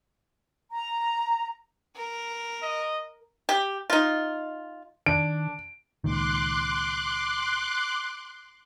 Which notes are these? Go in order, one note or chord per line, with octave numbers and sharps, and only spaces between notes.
A#5
A#4
D#5
G4
D#4 F4
D#3 D4 D7
C#2 A#2 D#3 C6 D6 F#6